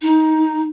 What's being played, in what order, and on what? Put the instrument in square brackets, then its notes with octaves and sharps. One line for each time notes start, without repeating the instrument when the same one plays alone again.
[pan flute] D#4